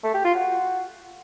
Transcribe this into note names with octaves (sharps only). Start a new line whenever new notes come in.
A3
G4
F4
F#4